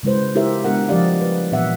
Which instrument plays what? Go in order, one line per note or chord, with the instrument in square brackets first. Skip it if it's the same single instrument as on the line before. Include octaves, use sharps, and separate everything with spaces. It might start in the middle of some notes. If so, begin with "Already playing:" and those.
[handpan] C#3 G#3 E4 B4 C5
E4 F4 G4 A#4 C5 E5
G#3 B3 D4 G4 A#4 F#5
F3 G3 G4 D5 D#5 F5
B4
A#2 E3 F#3 B3 E5 F#5